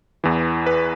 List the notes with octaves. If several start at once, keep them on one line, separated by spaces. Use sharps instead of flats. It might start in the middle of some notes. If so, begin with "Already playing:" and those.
E2 E3
B4